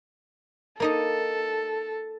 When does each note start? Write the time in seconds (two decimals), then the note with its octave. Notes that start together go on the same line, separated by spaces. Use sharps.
0.80 A#3 D#4 A4 D#5